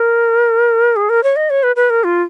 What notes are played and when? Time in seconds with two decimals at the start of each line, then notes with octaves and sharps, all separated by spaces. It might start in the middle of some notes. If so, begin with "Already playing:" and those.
Already playing: A#4
0.96 G#4
1.09 A#4
1.23 C#5
1.36 D#5
1.50 C#5
1.63 B4
1.76 B4
1.90 A#4
2.04 F4